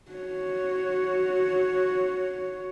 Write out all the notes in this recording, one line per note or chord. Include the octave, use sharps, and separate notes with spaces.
F#4 C#5